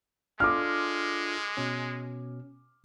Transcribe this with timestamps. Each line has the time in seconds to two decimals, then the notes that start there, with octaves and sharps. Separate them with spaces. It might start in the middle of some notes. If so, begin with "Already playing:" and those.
0.40 G#3 D4 F4 A4 D6 F6
1.57 B2 C#4